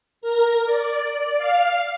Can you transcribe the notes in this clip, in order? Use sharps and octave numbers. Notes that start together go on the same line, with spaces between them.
A#4
D5
F5